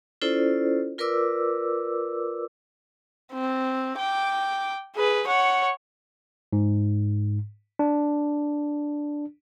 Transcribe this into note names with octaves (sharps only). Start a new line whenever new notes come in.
C#4 E4 F4 A4 C5 D5
F4 A#4 B4 D5 D6 E6
C4
G5 D6
G#4 B4
C#5 F#5
G#2
D4